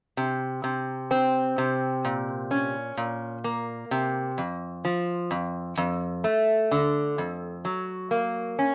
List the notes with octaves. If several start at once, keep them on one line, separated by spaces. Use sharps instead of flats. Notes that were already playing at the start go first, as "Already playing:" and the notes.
C3
C3
C4
C3
A#2
C#4
A#2
A#3
C3
F2
F3
F2
F2
A3
D3
F2
F#3
A#3
C#4